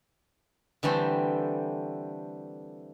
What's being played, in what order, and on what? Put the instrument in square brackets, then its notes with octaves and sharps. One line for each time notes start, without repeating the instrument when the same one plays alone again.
[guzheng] D3 E3 G3 A3 C4